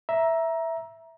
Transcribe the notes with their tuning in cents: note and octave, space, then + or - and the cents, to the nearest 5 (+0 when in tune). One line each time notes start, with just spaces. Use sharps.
E5 +0 A#5 +15